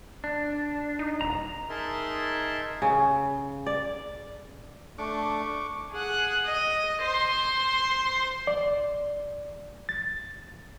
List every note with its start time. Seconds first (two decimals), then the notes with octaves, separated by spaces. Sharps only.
0.24 D4
0.99 D#4
1.21 D#1 A#5
1.69 D#4 G#4 A#4 E5 A5 C6
2.82 C#3
3.66 D5
4.98 A3 D4 C#6 D6
5.92 G#4 F#5
6.46 D#5
7.03 C5 C6
8.47 D5
9.89 A6